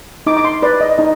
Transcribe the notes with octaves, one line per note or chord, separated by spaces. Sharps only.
D#4 D6
D6
C6
B4 D5
D#5
D#4 D#5